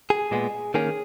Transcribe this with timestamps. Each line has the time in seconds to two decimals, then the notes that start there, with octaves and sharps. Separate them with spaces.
0.10 G#4
0.31 A#2 G#3 B3
0.74 D#3 A#3 C#4 G#4